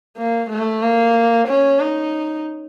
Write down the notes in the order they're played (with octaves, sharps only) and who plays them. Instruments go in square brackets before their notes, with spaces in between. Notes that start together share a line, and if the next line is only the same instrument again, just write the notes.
[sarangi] A#3
A3
A#3
C#4
D#4